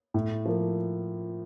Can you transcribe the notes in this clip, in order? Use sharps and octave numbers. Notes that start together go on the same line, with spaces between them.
A2
F3 A#3